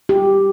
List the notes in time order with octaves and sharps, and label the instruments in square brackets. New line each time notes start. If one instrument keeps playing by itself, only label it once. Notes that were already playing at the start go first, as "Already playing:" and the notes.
[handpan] G4